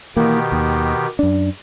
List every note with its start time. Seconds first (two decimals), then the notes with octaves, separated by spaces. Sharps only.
0.17 B2 D#3 E3 A#3 G4
0.52 D#2
1.19 F#2 D4